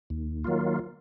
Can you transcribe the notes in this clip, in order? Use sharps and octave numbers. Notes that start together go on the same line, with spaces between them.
D#2
D#3 F#3 A#3 F4